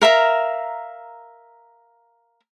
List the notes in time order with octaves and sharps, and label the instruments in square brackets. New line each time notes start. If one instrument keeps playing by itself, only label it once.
[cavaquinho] A#4 E5 F5 A#5